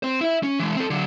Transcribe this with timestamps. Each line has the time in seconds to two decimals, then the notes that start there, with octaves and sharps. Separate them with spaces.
0.03 C4 C5
0.21 E4 E5
0.43 C#4
0.60 E3 G#3
0.76 C4 A4
0.90 D3 F#3